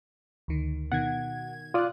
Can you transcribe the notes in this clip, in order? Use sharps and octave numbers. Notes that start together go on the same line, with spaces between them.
D2 D#3
B2 D#3 F#5 G#6
F4 D5 D#6 F#6